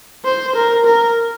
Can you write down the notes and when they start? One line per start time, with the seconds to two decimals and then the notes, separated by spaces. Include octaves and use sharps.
0.24 C5
0.55 A#4
0.85 A#4